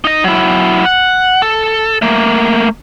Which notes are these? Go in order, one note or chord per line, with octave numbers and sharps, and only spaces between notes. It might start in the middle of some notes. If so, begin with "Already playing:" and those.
D#4 D#5
F#3 E4
F#5
A4
A3 A#3